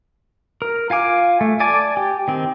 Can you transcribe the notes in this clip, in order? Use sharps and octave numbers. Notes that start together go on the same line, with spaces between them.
A#4
F4 F5 G#5 D6
A3
D5 G#5 A5 D6
G4
D#3 C4